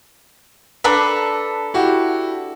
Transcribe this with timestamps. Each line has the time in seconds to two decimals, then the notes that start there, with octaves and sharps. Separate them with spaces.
0.84 D4 A4 B4 A#5
1.74 E4 F#4 G4